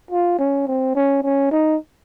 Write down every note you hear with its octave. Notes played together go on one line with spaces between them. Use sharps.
F4
C#4
C4
C#4
C#4
D#4